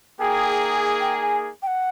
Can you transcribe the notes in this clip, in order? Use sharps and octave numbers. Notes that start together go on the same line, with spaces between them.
A#3 D#4 G#4 G5
G5
G#5
G5
F#5